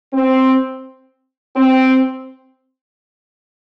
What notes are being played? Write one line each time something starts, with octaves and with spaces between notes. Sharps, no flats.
C4
C4